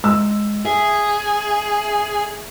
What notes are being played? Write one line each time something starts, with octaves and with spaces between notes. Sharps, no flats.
G#3 E6
G#4 E5